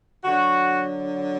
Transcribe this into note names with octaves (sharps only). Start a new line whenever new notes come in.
D3 F#3 F#4